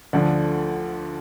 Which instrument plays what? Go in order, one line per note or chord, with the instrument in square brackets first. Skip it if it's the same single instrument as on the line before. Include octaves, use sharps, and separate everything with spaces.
[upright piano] D2 D3 F3 A3 D4